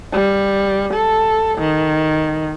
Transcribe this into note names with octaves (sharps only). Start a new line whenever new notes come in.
G3
A4
D#3